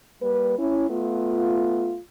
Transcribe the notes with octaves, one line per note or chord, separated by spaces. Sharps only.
G3 A#3 B4
C#4 E4
A3 B3 F4